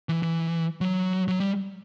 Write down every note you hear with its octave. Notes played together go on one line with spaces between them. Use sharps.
E3
E3
F#3
F#3
G3